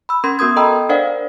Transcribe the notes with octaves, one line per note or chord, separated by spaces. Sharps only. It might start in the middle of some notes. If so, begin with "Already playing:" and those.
B5 E6
C#4 A#4 C6 G#6
B3 F#4 A#4 D#6 G#6
A4 D#5 G5 A#5 B5 E6
D4 A#4 C5 D5 F5 F#5